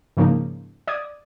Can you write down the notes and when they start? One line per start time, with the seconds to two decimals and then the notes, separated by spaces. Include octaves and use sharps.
0.17 G#2 C#3 F3 A#3 D#4
0.87 D5 D#6 G#6